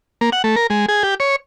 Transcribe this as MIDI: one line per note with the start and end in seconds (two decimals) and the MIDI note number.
0.21 0.30 58
0.32 0.42 78
0.44 0.56 57
0.56 0.67 70
0.70 0.86 56
0.88 1.03 68
1.03 1.15 67
1.20 1.36 73